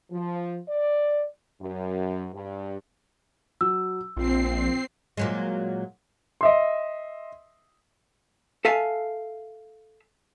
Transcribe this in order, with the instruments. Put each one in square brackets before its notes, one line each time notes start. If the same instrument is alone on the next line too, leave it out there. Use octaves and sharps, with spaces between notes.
[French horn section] F3
D5
F#2
G2
[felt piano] F#3 [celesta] E6
[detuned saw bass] A#1 [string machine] C4 C7 [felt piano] F4
[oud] A#2 F#3 G#3
[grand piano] D#5 E5 C6
[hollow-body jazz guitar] A4 E5 F5 G#5 A5